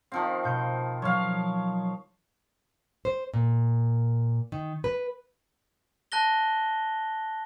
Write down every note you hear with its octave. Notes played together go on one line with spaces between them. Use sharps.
D#3 F3 C4 F5 F#5
B2 G6 C#7
F3 F#3 C#5 F5
C5
A#2
D#3
B4
A5 F#6 A#6 G7